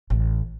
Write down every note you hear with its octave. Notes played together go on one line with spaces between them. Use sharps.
A1